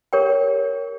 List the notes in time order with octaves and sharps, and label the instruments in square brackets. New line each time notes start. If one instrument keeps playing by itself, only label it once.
[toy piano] G4 A#4 C#5 G5